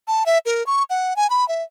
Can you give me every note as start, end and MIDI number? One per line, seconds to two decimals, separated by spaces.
0.08 0.24 81
0.26 0.38 76
0.46 0.65 70
0.66 0.83 85
0.90 1.16 78
1.16 1.29 80
1.30 1.47 83
1.48 1.63 76